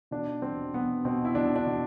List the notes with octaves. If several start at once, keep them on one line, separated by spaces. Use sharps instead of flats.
B2 D4
B2 C4
B2 B3
B2 C4
E4
B2 D4
D4
B2